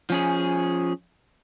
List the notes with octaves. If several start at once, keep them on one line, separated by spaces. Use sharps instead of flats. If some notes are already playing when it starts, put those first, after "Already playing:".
F3 C#4 G#4